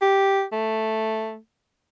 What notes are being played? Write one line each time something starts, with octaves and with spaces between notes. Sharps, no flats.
G4
A3